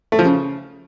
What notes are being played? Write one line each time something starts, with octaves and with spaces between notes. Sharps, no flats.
A3
F3
C#3